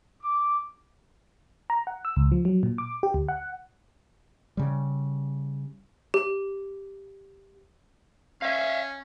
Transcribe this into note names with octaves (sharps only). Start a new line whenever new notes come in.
D6
A#5
F#5
E6
C#2
F3
F#3
A#2
D6
G4
D2
F#5
C#3 G3
G4
C#4 E5 F5